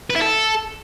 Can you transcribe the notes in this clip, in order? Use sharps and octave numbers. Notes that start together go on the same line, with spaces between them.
B4
E4
A4